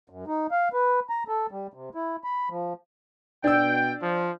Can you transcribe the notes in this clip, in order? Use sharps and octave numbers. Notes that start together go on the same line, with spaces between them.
F#2
D#4
F5
B4
A#5
A4
G3
C3
E4
B5
F3
B2 D4 G5 E6
F3